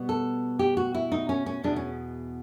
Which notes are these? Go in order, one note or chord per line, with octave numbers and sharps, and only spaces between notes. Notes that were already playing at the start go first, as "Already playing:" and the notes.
Already playing: B2 G3 B3
A4
G4
F#4
E4
D#4
C#4
C#4
E2 B2 G#3 D4
C#4